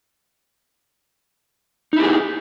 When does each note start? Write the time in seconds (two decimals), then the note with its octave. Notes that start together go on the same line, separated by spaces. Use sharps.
1.93 D#4
1.96 E4
2.00 G4
2.03 G#4